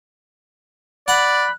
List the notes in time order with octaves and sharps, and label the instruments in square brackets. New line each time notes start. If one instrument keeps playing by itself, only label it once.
[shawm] D5 [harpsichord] F#5 [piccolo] B5 [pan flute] F#6